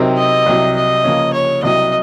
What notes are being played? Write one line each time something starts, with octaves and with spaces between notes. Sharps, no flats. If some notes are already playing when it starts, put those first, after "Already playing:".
Already playing: C3 F#3 C4 D#4 A#4
D#5
C2 C3 F#3
D#5
C#3 F3 A#3 C#4
C#5
C2 C3 F#3 D#5